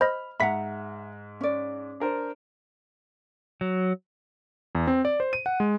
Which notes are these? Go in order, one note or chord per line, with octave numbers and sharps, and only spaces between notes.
C5 D#5 B5 F6
G#2 E5 F#5 A#5 B5 B6
C#4 D5
D4 A#4 C5
F#3
E2
C4
D5
C5
D#7
F#5
G#3